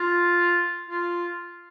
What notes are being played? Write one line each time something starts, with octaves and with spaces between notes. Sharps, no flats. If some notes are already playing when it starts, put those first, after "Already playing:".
Already playing: F4
F4